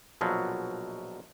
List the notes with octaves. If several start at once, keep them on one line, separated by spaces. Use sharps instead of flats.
A#1 B2 F3 F#3